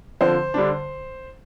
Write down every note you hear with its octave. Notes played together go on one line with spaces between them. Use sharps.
D3 F3 C4 C5
D3 G3 D4